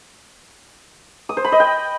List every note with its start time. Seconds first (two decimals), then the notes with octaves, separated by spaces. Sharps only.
1.29 D#6
1.37 C5
1.45 B5
1.52 D#5
1.60 G5